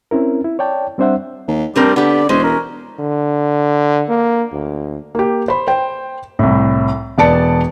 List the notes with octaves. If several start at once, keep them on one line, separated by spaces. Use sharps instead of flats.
C4 C#4 E4 A#4
E4
C#5 D5 G5 A5
G3 C4 D4 C5 E5 F#5
D#2
G2 G3 A3 C4 A#4
D3 B3 G4 D5
E1 G#3 C#4 C5
A#4
D3
A#3
D2
A#3 G4
C5 B5
C5 G5
C2 A2
E1 B3 D5 A5 C#7